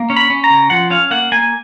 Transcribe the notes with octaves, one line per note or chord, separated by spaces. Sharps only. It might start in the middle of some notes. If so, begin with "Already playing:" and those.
Already playing: A#3
C#4
B5
C#4
A#5
C#3
F3 F#5
C#4 F5
A#3 F#5
A#3 G#5